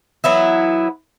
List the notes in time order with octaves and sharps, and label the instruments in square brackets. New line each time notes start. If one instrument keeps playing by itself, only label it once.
[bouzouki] E3 F#3 B3 E4